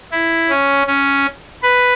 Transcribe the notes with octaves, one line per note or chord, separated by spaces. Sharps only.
E4
C#4
C#4
B4